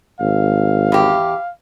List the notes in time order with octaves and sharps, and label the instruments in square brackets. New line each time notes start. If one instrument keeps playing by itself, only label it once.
[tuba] G#1 [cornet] F5
[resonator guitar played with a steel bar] E2 G4